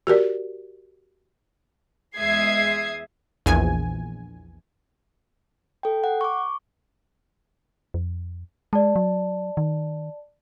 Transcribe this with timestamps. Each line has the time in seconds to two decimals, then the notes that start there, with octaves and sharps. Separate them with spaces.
0.07 F#4 G4 A#4 D5
2.17 E2 G#3 E5 D#6 G#6 C7
3.46 A#1 E2 G#5
5.83 A4 G5
6.04 F#5
6.21 C#6 D6
7.94 F2
8.73 G#3 D5 A5
8.96 F#3
9.57 D#3